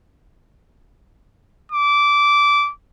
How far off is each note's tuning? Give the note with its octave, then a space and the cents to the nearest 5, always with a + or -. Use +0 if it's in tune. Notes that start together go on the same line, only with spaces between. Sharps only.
D6 -15